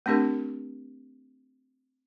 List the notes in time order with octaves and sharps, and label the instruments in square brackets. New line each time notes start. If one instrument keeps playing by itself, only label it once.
[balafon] A3 C4 D4 G4 A#4